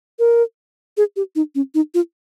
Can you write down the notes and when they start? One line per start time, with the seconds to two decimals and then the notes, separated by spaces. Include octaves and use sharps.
0.19 A#4
0.97 G#4
1.16 G4
1.36 D#4
1.55 C#4
1.75 D#4
1.94 F4